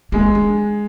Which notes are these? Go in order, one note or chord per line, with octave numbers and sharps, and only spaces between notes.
G#3 A#3
D4